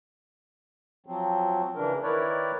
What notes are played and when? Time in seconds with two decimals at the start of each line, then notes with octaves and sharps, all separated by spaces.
1.06 F3 F#3 C4
1.76 C#3 E3 D4 A#4
2.03 D#3 E4 A#4 B4 C#5 D5